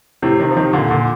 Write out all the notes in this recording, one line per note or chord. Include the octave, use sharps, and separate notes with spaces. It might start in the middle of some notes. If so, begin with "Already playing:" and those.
A2 C3
C3 D#3
F3
C3 D#3
A#2 D3
A#2 D3